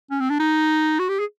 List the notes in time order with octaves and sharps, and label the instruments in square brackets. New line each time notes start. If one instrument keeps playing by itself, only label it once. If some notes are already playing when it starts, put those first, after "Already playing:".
[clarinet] C#4
C4
D4
D#4
F#4
G4
G#4